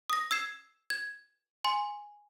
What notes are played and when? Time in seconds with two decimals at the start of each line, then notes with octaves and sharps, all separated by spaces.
0.10 D#6 A#6
0.31 E6 G#6 C7 E7
0.90 G#6
1.64 G#5 C6